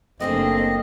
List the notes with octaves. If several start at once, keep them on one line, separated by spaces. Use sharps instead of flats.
F#1 A3 A#3 C4 D4 G#4 D#5